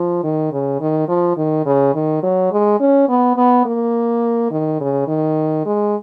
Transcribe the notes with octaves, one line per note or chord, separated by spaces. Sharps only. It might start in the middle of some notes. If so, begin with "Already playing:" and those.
Already playing: F3
D#3
C#3
D#3
F3
D#3
C#3
D#3
F#3
G#3
C#4
B3
B3
A#3
D#3
C#3
D#3
G#3